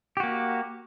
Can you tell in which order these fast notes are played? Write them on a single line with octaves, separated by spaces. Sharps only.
G4 F#4 A#3